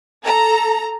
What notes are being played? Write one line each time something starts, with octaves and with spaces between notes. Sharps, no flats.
A4 A#5